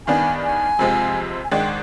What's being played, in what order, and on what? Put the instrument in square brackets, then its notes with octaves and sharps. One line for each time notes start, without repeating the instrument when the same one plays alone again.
[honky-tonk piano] G2 D#3 B3 D4 [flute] G#5
[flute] G#5
[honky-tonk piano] F2 C3 F3 G#3 C4
[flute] G#5
[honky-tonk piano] G#2 D#3 G#3 D4 [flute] G5